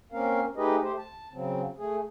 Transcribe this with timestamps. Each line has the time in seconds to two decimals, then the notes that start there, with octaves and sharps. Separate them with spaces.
0.12 A#3 C4 C#4 A#4 F5
0.56 A3 D#4 G4 G#4 B4 D#5
0.83 A3 G4 C5
0.98 A5
1.33 C#3 F#3 C4
1.78 A3 G#4